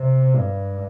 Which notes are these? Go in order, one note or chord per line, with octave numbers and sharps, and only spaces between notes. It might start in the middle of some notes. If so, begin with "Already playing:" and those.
Already playing: C3
G2